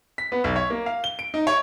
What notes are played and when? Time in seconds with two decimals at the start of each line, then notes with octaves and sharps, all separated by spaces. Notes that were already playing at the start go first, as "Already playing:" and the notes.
0.18 B6
0.32 B3
0.44 B1
0.56 C#5
0.70 A#3
0.86 F5
1.04 G7
1.19 D7
1.34 D#4
1.47 C#5